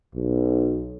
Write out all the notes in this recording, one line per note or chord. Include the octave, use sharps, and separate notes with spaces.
B1